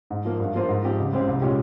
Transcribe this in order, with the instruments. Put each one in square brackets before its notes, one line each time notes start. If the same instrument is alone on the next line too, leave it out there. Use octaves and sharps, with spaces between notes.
[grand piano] G#2
F3 A#3
G2
F3 A#3 F4 C5
G#2
F3 C4 G4
C#2
C#3 G#3 C4 G4
C2
A#2 G#3 C#4 G4